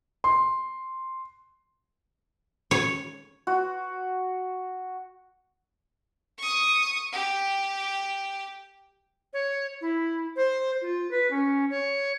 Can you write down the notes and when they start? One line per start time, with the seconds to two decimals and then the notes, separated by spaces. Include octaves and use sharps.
0.24 C6
2.71 C#5
3.47 F#4
6.38 C#6 D#6
7.13 G4
9.34 C#5
9.81 E4
10.36 C5
10.82 F4
11.11 B4
11.31 C#4
11.71 C#5